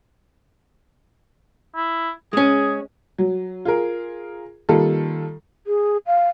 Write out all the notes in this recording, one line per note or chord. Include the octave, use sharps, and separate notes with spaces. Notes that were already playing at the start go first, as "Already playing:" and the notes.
E4
G#3 C#4 G#4
F#3
F4 G#4 A#4
D#3 G3 A#3 F4 A4
G#4
F5